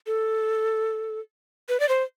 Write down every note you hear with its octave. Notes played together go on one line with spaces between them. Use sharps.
A4
B4
D5
C5